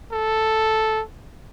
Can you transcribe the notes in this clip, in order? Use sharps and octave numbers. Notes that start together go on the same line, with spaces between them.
A4